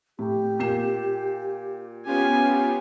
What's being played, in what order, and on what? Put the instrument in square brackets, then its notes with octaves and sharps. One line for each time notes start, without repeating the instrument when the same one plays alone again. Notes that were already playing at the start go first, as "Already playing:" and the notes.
[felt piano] A2 [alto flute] G4
[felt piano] A#2 C7 E7
[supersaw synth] B3 F4 G4 [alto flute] C#4 [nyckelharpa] G#5